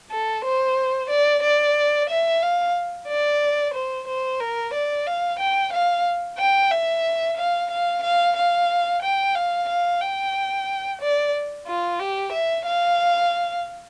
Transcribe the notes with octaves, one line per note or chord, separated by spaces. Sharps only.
A4
C5
D5
D5
E5
F5
D5
C5
C5
A#4
D5
F5
G5
F5
G5
E5
F5
F5
F5
F5
G5
F5
F5
G5
D5
F4
G4
E5
F5